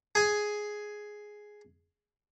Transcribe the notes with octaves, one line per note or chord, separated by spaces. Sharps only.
G#4 G#5